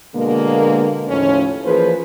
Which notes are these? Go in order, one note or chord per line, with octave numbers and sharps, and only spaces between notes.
B2 D3 G#3 A#3
D#2 A2 C#3 F3 C#4
E3 F3 A#3 G#4 B4 C5